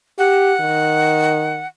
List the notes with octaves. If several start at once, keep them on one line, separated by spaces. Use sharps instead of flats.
G4 F#5
D#3